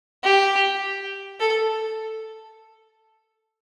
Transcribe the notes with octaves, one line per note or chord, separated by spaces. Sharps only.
G4
A4